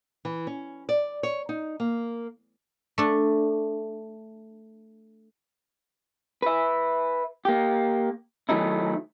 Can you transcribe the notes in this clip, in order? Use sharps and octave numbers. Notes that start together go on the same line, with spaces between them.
E3
C#4
D5
C#5
D#4
A#3
A3 D4
B4 E5
A#3 G4
D#3 F#3 A3 D#4 E4